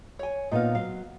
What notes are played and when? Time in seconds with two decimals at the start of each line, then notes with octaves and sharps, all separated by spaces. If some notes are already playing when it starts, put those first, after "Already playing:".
0.19 C#5 G#5
0.51 A#2 B3 D#4 F5
0.75 F#3 F5